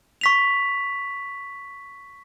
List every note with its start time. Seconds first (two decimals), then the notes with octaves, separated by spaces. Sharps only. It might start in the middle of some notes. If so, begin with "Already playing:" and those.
0.21 C#6 B6 F7